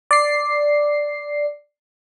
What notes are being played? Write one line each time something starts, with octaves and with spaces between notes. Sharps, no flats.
D5 C7